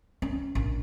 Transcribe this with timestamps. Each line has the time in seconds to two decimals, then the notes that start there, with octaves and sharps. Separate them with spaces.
0.22 C#4
0.55 A#1